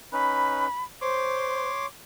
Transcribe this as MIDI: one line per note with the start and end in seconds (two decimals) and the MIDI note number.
0.13 0.67 61
0.13 0.67 63
0.13 0.67 71
0.13 0.84 83
1.02 1.70 72
1.02 1.86 73
1.02 1.86 84
1.02 1.86 86